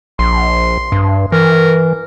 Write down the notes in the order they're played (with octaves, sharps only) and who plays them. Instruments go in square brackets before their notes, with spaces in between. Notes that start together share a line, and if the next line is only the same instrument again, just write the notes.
[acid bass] A#1 [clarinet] C6
[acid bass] G2
[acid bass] E3 [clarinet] A#4